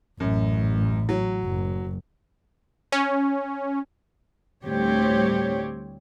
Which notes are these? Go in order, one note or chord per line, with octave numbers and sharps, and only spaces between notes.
A1 F#2
F#3
F#1
C#4
D2 A2 G3 C4 G4 C#5